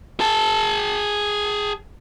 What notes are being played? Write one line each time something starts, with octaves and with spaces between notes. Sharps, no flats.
G#4 A5